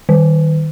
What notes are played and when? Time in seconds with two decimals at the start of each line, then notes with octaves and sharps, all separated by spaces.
0.09 D#3